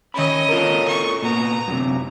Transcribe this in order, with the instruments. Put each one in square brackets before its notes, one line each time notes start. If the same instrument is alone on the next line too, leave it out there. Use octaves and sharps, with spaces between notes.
[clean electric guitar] D#3 B5 [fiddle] C#4 D#5
[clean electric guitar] F4 A4 A#4
[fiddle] C#6
[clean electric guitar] A#2 B3 [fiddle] A#5
[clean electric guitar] F#2 C3